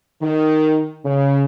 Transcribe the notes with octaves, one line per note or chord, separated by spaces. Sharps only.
D#3
C#3